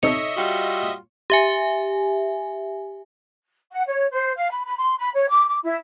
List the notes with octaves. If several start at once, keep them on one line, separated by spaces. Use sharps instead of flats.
C3 D#4 A4 C#5 D#5 E5
G3 F4 F#4
G4 E5 G#5
F#5
C#5
C5
F5
B5
B5
C6
B5
C#5
D6
D6
E4